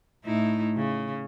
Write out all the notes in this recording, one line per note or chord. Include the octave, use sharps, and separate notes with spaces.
A2 D#4 E4
C#3